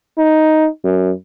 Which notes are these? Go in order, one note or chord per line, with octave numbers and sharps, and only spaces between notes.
D#4
F#2